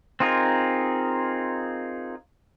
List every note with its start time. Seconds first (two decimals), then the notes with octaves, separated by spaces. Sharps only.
0.20 C4 D#4 F4 G#4 A#4